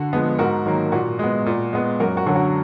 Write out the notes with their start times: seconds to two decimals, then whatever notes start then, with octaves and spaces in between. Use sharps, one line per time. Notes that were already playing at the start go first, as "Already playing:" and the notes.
Already playing: D3 F#4
0.13 F3 G#3 B3
0.38 G#2 F#4 A#4
0.66 D#3 F#3 A#3
0.92 A#2 F#4
1.19 G#3 B3
1.46 A#2
1.73 G#3 B3
2.00 F#2 F#4 A#4
2.17 F#4
2.26 D3 F#3
2.35 F#4